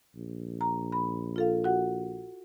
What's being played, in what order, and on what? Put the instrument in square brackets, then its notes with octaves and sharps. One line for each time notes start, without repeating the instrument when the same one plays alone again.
[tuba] A#1
[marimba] A#5
B5
F4 A4 F5
F#4 F#5